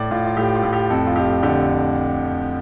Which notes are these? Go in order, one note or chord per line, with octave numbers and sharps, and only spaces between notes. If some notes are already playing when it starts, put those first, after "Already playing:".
Already playing: A2 D5
A2 F4
F4
A2 G4
F4
A2
G4
F2 A4
F4
F2 G4
D3 G4